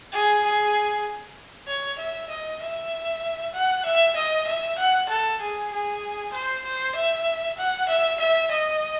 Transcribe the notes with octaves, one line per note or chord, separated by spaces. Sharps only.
G#4
G#4
C#5
E5
D#5
E5
F#5
E5
D#5
E5
F#5
A4
G#4
G#4
C5
C5
E5
F#5
E5
E5
D#5